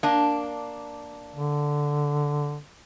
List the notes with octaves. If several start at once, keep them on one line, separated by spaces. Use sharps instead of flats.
A#3 D4
D3